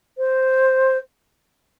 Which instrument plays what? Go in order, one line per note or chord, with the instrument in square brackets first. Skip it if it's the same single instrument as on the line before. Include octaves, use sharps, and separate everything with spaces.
[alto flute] C5